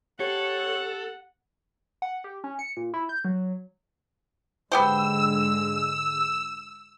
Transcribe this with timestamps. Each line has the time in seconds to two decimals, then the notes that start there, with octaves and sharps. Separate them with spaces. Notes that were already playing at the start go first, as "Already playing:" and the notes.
0.20 G4 A4 C#5 F#5
2.02 F#5
2.24 G4
2.44 C#4
2.59 C#7
2.77 A#2
2.94 E4
3.09 G6
3.25 F#3
4.72 G#2 D3 G#3 B3 G4 C5 E6